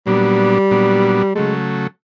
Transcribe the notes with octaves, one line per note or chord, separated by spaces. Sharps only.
A#2 F#3 G3 B3 D4
A#2 F#3 B3 D4
C#3 F#3 G#3 A3